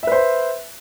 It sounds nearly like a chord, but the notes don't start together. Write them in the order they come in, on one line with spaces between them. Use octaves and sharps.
E5 B4 C5